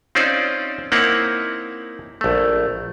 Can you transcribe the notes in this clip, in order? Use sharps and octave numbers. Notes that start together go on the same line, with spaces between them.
C4 C#4 D#4 F4 C5 D5
A#3 C4 D#4 E4 C#5 F#5
A#1 A3